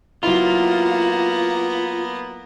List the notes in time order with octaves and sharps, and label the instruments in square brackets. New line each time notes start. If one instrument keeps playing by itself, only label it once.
[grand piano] F#3 E4 [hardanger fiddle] A#3 B3 [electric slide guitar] F4